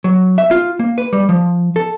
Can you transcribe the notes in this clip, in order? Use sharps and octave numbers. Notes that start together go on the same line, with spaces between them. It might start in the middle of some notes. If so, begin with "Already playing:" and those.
F#3
E5
F4
A#3
B4
G3
F3
A4